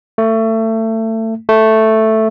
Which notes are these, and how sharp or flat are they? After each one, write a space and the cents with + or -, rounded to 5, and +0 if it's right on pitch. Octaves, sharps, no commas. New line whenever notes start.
A3 +25
A3 +0